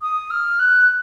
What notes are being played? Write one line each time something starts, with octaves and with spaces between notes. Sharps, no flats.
D#6
F6
F#6